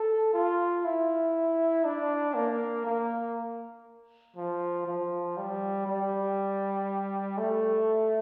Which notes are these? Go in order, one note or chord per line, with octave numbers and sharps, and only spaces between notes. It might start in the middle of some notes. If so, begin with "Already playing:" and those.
Already playing: A4
F4
E4
D4
A#3
A#3
F3
F3
G3
G3
A3